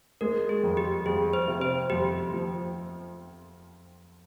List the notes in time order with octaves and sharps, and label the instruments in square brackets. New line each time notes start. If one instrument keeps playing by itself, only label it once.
[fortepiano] G#3 [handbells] A#4
[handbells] G#4
[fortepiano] F2
[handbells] G4
[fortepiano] F2 [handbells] G#4
[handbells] C5
[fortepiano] C3
[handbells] C5
[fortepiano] F2 [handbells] G4
[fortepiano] F3